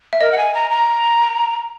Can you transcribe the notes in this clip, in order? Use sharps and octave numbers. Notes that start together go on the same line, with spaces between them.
E5
A#4 D#5
F#5
G#5
A#5
A#5